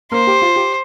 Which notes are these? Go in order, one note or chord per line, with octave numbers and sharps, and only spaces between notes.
A#3 A#4 C5
G4
F4
G4